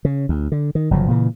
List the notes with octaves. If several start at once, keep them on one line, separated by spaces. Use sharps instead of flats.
C#3
D2
D3
D#3
G1 C#3 F3 F#3
A#2 C#3 E3